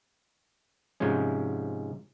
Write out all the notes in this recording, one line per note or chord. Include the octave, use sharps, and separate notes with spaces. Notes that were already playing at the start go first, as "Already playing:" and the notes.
G#2 C3 F3 G#3 C#4